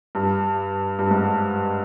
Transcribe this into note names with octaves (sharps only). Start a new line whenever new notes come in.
G2
G2
G#2